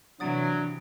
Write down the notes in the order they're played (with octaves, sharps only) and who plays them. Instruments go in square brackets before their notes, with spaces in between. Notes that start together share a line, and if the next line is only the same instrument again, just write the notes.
[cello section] C3 E3 [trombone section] F#3 [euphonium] D4 [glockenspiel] D#6 A6 D7